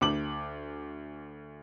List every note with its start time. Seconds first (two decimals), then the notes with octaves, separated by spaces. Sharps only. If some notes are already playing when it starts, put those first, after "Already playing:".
0.01 D2 D6 F#7